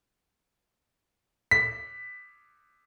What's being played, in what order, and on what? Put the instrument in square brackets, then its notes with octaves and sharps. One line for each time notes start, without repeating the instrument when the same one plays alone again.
[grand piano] B6